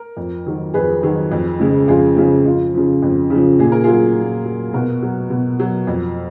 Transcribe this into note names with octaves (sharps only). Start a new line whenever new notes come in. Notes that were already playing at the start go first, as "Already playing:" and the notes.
Already playing: A#4
F2
D#3 F#3
F2 G#4 B4
D#3 F#3
F2
C#3 G#3
F2 F4 G#4
C#3 G#3 F4
F2 F4
C#3 F3
F2
C#3 F3
A#2 G#4
A#4
F#3 F4 G#4
A#2
F#3
B2 F#4 A#4
F#3
B2
F#3
F2